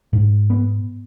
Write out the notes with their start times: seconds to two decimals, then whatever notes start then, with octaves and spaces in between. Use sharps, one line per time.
0.13 G#2
0.50 B3